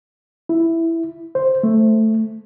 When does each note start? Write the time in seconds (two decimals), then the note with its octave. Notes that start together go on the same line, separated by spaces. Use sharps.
0.49 E4
1.35 C5
1.63 A3